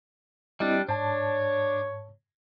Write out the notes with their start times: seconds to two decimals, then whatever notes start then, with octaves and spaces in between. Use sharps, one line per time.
0.60 G3 C4 D4 E4 D#5
0.89 G#2 D4 C#5 A5